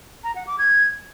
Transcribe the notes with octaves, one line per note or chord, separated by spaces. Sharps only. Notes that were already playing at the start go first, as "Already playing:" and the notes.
A#5
F#5
D6
G#6